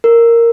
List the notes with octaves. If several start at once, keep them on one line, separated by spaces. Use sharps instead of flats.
A#4